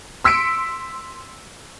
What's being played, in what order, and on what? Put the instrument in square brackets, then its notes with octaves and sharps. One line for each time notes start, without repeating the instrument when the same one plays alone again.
[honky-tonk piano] C6 E6 B6 C#7 D7